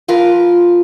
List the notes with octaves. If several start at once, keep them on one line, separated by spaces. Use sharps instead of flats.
F3 F4 A#4 B4